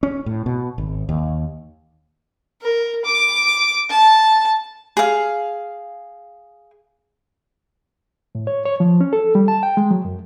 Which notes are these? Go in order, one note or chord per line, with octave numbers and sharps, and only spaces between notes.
C#4
A2
B2
G#1
D#2
A#4
D6
A5
G#4 F5
A2
C#5
C#5
F3
C#4
A4
G3
A5
G5
G#3
F#3
F#2